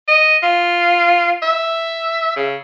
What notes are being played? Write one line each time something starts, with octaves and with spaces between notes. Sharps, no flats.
D#5
F4
E5
C#3